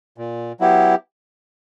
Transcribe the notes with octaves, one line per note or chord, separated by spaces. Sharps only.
A#2
F#3 B3 E4 G4